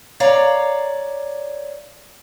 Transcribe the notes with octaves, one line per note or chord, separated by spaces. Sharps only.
C#5 D5 F5 A#5